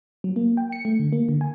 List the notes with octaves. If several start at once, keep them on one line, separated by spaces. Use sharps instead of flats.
F#3
A#3
G5
C#7
A3
D3
A#3
D3
G#5